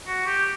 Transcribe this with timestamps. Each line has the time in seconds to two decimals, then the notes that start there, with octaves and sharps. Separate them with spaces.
0.07 F#4
0.27 G4